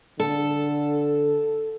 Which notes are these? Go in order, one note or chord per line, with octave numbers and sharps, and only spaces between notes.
D3 A4